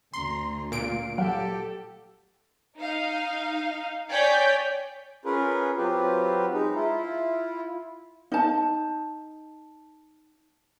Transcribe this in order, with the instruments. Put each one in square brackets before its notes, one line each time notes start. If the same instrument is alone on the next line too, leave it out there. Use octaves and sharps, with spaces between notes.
[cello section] D2 [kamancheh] A#5 [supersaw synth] C6
[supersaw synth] A#2 D7 [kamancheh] F5
[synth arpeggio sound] F#3 F5 F#5 [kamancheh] G4 A4
[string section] D#4 F5
C#5 D5 G5 G#5 G6 B6
[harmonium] C#4 F4 G#4 A#4 B4
F#3 C4 F4 G4 B4
G#3 D#4
E4 F4
[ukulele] D#4 A5